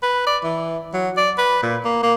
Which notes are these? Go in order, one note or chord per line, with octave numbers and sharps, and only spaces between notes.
B4
D5
E3
F#3
D5
B4
A#2
A#3
A#3